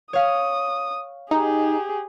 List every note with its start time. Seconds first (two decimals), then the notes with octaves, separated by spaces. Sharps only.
0.13 C#5 F5 D#6
1.31 D#4 G4 G#4